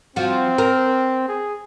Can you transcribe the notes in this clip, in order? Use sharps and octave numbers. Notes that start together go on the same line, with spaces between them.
F3 C4 F#4
A#4
G#4